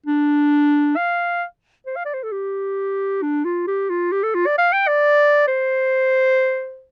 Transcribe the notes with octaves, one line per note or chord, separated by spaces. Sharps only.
D4
F5
C5
F5
D5
C5
A4
G4
D4
F4
G4
F4
G4
A4
F4
D5
F5
G5
D5
C5